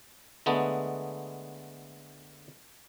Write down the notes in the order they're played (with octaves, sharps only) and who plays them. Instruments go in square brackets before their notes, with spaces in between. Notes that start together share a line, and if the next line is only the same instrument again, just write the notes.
[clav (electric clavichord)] D3 G#3 A3 B3